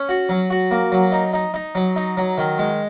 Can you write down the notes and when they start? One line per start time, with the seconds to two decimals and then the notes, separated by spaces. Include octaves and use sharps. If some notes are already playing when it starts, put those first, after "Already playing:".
Already playing: C#4
0.09 F#4
0.29 F#3
0.50 F#4
0.71 A#3
0.92 F#3
1.12 D#4
1.33 D#4
1.54 D#4
1.75 F#3
1.96 D#4
2.17 F#3
2.38 D#3
2.59 G#3